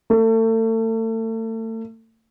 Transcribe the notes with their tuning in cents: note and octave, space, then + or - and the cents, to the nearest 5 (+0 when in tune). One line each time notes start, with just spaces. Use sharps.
A3 +35